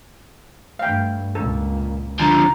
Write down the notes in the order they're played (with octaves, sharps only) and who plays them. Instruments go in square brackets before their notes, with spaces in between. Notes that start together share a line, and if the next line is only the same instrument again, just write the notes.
[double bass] G2 A3 [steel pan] F5 G5
[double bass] C#2 A#2 [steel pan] A4
[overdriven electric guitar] D3 F3 [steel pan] A5 [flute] A#5